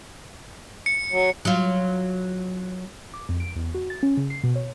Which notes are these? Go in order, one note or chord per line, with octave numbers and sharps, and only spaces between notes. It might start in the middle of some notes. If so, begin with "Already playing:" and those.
C#7
F#3
F#3 F4
D6
F2
D7
E2
F#4
A6
C#4
C#3
C7
B2
C#5